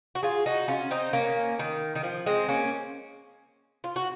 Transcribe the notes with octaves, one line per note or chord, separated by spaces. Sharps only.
F#4
F4 G#4
D#4 F#4
C#4 F4
C4 D#4
A#3 C#4
D#3
D#3
F3
G#3 C4
A#3 C#4
F4
F#4